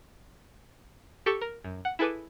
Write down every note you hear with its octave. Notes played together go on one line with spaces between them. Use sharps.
G4 A4 A5 C#6 C#7 E7
A#4
F#2
F#5
E4 G#4 A4 B4 G#5 D6